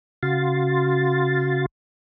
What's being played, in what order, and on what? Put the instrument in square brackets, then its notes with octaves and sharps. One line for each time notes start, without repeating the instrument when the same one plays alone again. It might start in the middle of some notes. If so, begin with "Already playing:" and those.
[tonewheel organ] C#3 F#4 F5 C6 A6